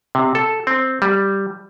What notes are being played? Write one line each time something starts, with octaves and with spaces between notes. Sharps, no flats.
C3
A4
C4
G3